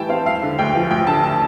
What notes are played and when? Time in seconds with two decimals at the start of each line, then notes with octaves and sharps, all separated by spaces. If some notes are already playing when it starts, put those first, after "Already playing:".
Already playing: A2 E3 G3 G5 A5
0.09 C4 F5
0.25 E1 F5
0.42 D3
0.59 D2 G5
0.75 F3
0.90 A1 G5
1.07 D3 A5
1.23 A5